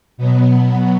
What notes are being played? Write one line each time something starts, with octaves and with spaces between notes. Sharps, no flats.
B2 F#3 B3